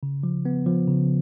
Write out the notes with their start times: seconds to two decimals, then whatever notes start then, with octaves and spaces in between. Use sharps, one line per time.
0.03 C#3
0.23 F3
0.45 B3
0.66 F3
0.87 C#3